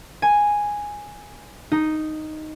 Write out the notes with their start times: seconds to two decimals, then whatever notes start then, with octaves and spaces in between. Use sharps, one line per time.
0.22 G#5
1.72 D#4